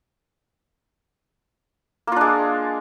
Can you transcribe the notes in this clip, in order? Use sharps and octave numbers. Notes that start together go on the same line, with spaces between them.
G#3 A#3 D4 F4